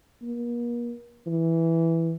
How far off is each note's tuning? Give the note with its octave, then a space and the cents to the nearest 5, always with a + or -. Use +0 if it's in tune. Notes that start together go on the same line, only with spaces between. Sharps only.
A#3 +40
E3 +0